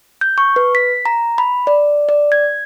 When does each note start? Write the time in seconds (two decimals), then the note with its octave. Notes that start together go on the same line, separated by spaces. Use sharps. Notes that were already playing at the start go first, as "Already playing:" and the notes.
0.21 G6
0.38 C#6
0.56 B4
0.75 B6
1.05 A#5
1.38 B5
1.67 D5
2.09 D5
2.32 G#6